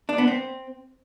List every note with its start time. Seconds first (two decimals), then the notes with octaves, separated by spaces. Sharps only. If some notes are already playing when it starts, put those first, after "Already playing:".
0.09 D4
0.18 B3
0.28 C4